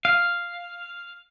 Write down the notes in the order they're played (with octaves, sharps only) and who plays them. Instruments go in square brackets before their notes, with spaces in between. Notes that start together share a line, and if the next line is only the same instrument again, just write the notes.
[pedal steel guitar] F5